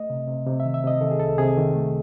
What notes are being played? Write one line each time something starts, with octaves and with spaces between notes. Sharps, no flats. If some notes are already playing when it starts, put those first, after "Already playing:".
Already playing: A3 D#5
C3
C3
C3
E5
D#3
E5
C3 D#5
D#3 A4
G#4
C2 A4
C3 G#4
D#3
A3